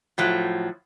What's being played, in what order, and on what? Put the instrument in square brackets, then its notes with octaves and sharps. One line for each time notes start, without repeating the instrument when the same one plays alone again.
[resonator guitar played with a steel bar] A2 F3 F#3